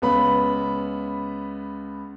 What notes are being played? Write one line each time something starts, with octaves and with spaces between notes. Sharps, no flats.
C#2 B3 B5